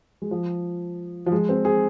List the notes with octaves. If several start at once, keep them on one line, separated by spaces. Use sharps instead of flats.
G#3
F3
F3
G#3
C4
G#4